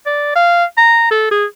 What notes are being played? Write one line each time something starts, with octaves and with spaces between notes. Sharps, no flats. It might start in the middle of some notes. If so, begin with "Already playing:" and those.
D5
F5
A#5
A4
G#4